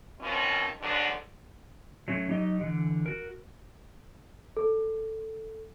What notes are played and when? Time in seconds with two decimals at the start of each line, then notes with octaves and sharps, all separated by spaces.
0.20 B2 D#3 F3 C4 C#4
0.80 G#2 D3 F#3 B3 D4
2.08 F#3 A3 C#4
2.29 F#3 D#4 G4 D#5
2.61 D3 E3
3.06 F#4 A#4
4.57 A4